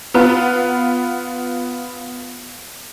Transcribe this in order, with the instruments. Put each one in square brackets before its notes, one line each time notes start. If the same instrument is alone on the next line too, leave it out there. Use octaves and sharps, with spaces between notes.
[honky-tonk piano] B3 F4 B4